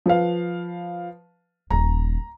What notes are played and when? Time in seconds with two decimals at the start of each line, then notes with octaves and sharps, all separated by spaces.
0.06 F3 B4 F5
1.71 D#1 A#5